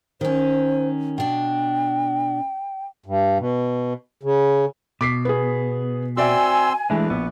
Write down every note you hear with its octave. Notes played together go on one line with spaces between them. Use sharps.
D#3 C#4 C5
B2 D4 G5
G2
B2
C#3
B2 D6 B6 C7
B3 G#4
C4 F#4 D5 E5 G#5 C6 E6
E3 G#3 A3 D4 B4
A#1 B3